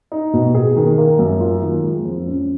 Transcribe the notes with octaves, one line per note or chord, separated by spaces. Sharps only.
D#4
B2
G#4
D#3
A#3
F#2
F4
D#3
G#3
F2
C#4